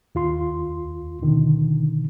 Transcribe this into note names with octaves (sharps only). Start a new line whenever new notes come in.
D#2 F4 C6
B2 D3 D#3